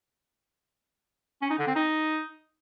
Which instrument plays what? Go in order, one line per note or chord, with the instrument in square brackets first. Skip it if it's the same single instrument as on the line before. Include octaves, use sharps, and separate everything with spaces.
[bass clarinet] C#4
D#4
D3
C4
D#4